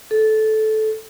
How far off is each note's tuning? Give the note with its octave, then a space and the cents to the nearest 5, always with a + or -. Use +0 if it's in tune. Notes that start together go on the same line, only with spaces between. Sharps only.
A4 -15